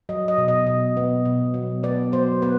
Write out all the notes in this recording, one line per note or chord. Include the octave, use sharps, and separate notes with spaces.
F#3 D#5
D#5
B2
D#5
B2
B3
B2
F#3
B3 D5
F#3 C5
B3 B4